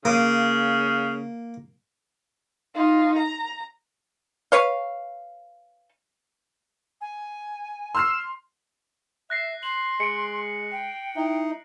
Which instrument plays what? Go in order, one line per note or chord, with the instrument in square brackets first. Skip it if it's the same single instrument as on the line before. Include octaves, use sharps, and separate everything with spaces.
[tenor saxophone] C#3 [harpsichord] A#3
[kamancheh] D#4 F4
A#5
[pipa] B4 C#5 F5
[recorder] G#5
[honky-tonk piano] C6 F6 C7 [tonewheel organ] E6
[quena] E5 [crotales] F#6 A#6 C7
[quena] C6 [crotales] F#7
[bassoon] G#3 [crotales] C#7 D7
[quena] G5
[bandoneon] D#4 [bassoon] E4